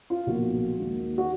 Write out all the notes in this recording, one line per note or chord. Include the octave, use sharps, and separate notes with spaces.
F4
B1 A#2 F3 A#3 F#4
D#2 D#3 G#3
F#4